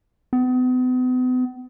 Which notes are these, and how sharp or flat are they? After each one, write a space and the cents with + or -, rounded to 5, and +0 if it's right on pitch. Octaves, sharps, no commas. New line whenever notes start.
B3 +40